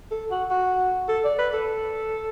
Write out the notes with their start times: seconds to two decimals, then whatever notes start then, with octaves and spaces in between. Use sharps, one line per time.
0.11 A4
0.31 F#4
0.51 F#4
1.09 A4
1.24 D5
1.38 B4
1.54 A4